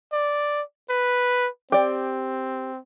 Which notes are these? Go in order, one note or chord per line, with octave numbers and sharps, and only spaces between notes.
D5
B4
C4 G4 D5